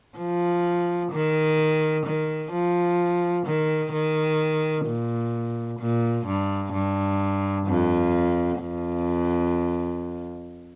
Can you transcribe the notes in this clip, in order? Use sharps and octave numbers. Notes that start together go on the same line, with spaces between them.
F3
D#3
D#3
F3
D#3
D#3
A#2
A#2
G2
G2
F2
F2